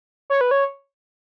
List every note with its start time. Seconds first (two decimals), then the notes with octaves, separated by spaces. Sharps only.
0.30 C#5
0.41 B4
0.51 C#5